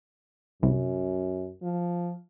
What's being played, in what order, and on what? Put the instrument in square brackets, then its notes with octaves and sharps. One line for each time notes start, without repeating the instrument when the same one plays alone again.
[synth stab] C2 [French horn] F#2
[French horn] F3